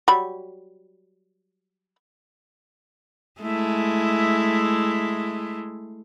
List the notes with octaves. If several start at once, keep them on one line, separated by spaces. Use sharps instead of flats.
F#3 G3 B5
G#3 A3 E4